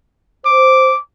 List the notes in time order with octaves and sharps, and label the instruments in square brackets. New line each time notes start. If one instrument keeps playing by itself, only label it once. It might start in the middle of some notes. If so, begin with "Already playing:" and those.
[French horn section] C5 [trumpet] D6